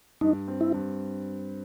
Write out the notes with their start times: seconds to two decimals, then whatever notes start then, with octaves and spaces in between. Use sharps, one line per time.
0.21 G2 D#4
0.48 C4
0.61 E4
0.74 G2